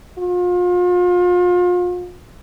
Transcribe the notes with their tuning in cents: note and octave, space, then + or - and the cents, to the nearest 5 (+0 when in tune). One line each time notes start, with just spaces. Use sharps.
F4 +35